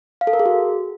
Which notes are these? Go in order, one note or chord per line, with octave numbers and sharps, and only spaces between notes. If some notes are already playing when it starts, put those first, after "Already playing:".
F5
A4
A#4
G#4
F#4